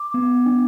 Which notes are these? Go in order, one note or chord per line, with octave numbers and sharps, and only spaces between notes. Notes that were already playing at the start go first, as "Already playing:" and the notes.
Already playing: D6
B3
D4